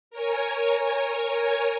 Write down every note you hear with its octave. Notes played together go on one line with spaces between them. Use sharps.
A#4 C#5 G#5